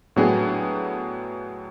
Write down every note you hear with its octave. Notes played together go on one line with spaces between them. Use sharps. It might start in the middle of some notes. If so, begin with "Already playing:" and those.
A2 F#3 B3 D4 G#4